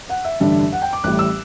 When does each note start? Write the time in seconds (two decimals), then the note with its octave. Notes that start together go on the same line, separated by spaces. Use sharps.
0.09 F#5
0.24 E5
0.40 A1 G2 D3 G3 D4 E5
0.72 F#5
0.82 G5
0.93 D6
1.04 A1 A2 G3 F#6
1.19 E6